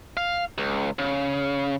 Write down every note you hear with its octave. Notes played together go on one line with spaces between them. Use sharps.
F5
C#2
C#3